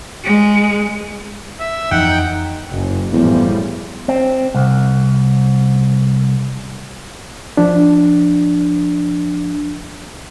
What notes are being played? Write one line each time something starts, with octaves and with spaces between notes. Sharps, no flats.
G#3
E5
F2 E3 F3 D#4 F#5 G5
F#1
E2 A2 F3 G3
C4
C2
F3 D4